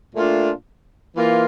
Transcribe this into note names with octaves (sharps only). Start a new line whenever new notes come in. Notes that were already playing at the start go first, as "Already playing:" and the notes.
A#2 A3 D4 F4
E3 A#3 F4